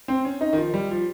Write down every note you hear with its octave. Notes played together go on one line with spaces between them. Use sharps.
C4
C#4
D#4
D#3
F3
G3
F3